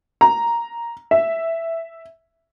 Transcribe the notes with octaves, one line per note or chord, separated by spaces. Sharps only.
A#5
E5